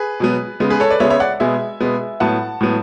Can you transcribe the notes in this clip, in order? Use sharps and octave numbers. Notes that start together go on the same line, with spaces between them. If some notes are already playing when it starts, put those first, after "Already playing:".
Already playing: G#4 B4
B2 F#3 B3
C#3 G#3 B3
G#4 B4
A4 C#5
B4 D5
C#3 G#3 B3 C#5 E5
C#5 E5
D5 F#5
B2 G#3 B3 E5 G#5
B2 G#3 B3
A2 F#3 B3 F#5 A5
A2 F#3 B3